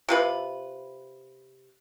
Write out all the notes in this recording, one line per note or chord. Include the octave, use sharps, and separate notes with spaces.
C3 F4 B4